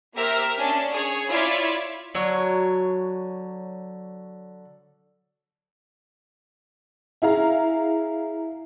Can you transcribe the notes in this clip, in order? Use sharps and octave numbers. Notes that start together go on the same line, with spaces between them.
A#3 G4 A#4 C5 E5 F6
C#4 D4 A5
G#4 C#5
E4 F4 C#5 D5 E5
D3 F#3 C#5
E4 G#4 F5 A#5